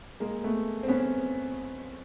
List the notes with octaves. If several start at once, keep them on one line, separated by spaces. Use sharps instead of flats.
G#3 A#3
A3 B3
C4
B3 C#4